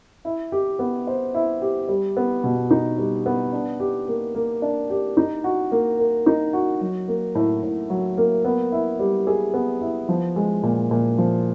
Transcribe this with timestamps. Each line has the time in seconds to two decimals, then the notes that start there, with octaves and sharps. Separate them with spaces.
0.25 E4
0.52 G4
0.79 B3
1.07 C5
1.35 E4
1.62 G4
1.89 G3
2.17 B3
2.44 B2
2.71 D#4
2.98 G3
3.26 B3
3.53 D4
3.80 G4
4.08 A#3
4.35 A#3
4.62 D4
4.90 G4
5.17 D#4
5.44 F#4
5.72 A#3
5.99 A#4
6.26 D#4
6.53 F#4
6.81 F#3
7.08 A#3
7.35 A2
7.63 A2
7.90 F#3
8.18 A#3
8.45 B3
8.72 E4
8.99 G3
9.27 G#4
9.54 B3
9.81 E4
10.09 F3
10.36 G#3
10.63 A#2
10.91 A#2
11.18 F3